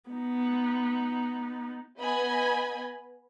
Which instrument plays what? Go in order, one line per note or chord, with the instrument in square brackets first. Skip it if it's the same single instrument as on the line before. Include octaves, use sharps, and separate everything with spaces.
[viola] B3 D#4
[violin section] B3 D#5 G#5 B5 G#6